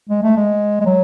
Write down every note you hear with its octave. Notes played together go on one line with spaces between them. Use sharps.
G#3
A3
G#3
G#3
F#3